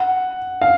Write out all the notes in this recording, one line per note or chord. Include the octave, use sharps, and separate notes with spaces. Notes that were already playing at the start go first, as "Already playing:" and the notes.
Already playing: F#5
F5